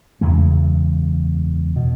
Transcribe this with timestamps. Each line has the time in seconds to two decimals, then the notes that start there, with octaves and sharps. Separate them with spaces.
0.21 F#1 E2 C#3 G#3
1.76 B2